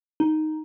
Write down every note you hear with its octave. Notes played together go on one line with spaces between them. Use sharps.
D#4